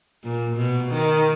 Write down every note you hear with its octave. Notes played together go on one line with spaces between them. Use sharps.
A#2
B2
D#3